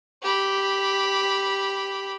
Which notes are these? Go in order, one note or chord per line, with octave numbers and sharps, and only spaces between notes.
G4 B5